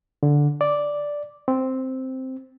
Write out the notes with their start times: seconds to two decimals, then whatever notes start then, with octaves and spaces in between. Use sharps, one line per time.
0.23 D3
0.61 D5
1.48 C4